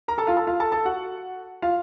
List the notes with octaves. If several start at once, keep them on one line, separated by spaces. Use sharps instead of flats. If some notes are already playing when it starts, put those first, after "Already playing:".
A#4 A#5
A4 A5
F4 F5
A4 A5
F4 F5
A4 A5
A4 A5
F#4 F#5
F4 F5